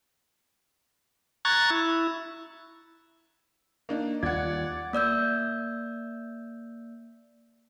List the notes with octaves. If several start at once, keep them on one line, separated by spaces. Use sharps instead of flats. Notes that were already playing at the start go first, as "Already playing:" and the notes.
A#5 C#6 F#6 G#6 A6
E4
A#3 D4 D#4
D#2 G3 A#3 F4 D5 F#5 G#6
A#3 D5 E6 G6